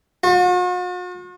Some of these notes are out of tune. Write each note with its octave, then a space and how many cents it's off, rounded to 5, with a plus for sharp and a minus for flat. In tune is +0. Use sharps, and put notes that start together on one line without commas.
F#4 -45